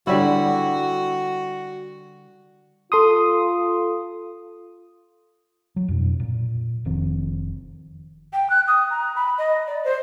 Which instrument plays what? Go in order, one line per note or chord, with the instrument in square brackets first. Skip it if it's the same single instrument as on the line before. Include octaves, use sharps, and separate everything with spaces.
[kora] D3 G3 E4 [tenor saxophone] F#4
[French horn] F4 [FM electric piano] A4 C6 D#6
[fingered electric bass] F#3
F2 B2
A#2
F1 F2 D#3 C4
[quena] G5
F#6
D#6
A#5
B5
D#5
D5
C5